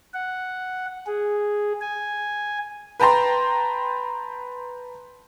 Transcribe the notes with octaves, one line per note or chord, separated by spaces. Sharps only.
F#5
G#4
G#5
B4 G5 A5 A#5 C6